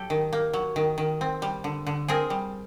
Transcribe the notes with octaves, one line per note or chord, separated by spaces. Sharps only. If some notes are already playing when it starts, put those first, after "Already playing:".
Already playing: F#3 G4 A4
D#3
A#3
F#3
D#3
D#3
C4
G3
D3
D3
C4 G#4 A#4
G3